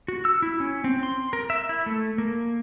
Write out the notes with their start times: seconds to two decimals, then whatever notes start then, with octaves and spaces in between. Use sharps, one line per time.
0.08 F#4
0.25 E6
0.42 E4
0.60 C#4
0.84 C4
1.03 C6
1.33 A#4
1.50 E5
1.69 E4
1.86 A3
2.18 A#3